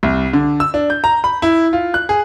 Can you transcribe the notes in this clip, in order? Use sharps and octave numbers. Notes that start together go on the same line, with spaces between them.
C2
D3
E6
D4
G6
A#5
B5
E4
F4
F#6
G#4